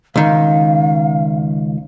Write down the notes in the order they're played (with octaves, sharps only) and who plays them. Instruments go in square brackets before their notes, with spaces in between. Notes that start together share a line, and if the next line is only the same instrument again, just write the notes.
[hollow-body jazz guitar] C#2 D#3 [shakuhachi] F5